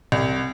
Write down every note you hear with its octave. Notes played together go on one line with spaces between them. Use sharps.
C2